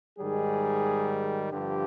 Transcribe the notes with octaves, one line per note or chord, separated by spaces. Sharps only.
G#2 D#3 G3 G#4
G2 D3 F3 G4